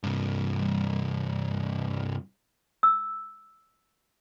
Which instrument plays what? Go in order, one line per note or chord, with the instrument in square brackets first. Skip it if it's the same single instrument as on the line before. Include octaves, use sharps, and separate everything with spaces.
[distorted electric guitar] C2 G2
[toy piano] E6